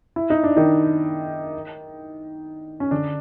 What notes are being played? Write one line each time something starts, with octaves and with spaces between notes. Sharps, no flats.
E4
D#4
D4
D#3 D#4
C#4
D3 D4